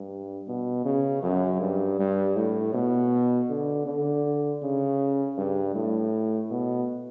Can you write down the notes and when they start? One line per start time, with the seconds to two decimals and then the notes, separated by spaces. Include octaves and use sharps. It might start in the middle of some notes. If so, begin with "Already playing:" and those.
Already playing: G2
0.48 B2
0.85 C#3
1.23 F#2
1.61 G2
1.99 G2
2.36 A2
2.74 B2
3.50 D3
3.87 D3
4.63 C#3
5.38 G2
5.75 A2
6.51 B2